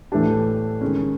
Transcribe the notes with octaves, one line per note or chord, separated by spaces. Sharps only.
A2 E3 A3 D4 G4
D#3 G#3 C#4